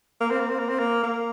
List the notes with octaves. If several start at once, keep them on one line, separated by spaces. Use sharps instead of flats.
A#3
C4
A#3
C4
A#3
C4
A#3
A#3